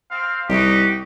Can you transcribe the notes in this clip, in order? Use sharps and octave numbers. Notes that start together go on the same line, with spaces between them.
C4 F5
C2 D#4 F#4 G4